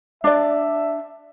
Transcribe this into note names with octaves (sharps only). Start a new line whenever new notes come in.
D4 D5 E5